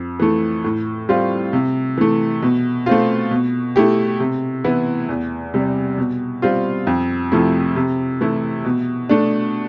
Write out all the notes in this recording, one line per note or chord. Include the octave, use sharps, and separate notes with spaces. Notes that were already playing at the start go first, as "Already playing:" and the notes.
Already playing: F2
E3 A3
A2
G3 C4 F4
C3
E3 A3
B2
A3 C4 F4
B2
A3 E4 G4
C3
E3 B3 E4
E2
C3 G3
B2
G3 C4 F4
F2
C3 F3 A3 E4
C3
E3 A3 E4
B2
A3 D4